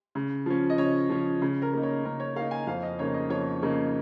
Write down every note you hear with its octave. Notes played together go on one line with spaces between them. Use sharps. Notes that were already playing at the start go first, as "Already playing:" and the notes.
C#3
F3 C#4
D#5
C#3 C#5
F3 C#4
C#3
A#4
A#3 D#4
C#5
C#3 A#4
C#5
A#3 D#4 F5
G#5
F2 F5
D#5
C#3 A#3 D#4 C#5
D#5
F2 C#5
C#3 A#3 D#4